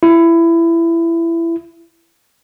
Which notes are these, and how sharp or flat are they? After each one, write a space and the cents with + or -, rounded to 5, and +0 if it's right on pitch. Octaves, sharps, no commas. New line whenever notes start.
E4 +20